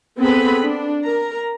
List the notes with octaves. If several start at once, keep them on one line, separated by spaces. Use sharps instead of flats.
B3 C4 G#4 A4 B4 B5
D4
A#4 A#5